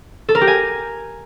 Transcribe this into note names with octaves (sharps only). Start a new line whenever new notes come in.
A4
A#4
G4
G#5